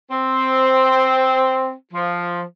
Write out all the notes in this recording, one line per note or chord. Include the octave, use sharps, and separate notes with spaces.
C4
F3